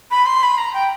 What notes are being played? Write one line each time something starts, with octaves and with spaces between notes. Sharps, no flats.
B5
C6
B5
A#5
G5